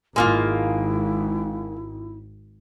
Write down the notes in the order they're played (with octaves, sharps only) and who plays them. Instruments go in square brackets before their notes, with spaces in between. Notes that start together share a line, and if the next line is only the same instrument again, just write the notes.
[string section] G#1 [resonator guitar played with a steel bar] G#3 A#3 F4 [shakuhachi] E4